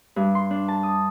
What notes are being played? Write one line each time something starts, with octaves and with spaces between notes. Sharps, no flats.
G2
C6
D4
A5
D#6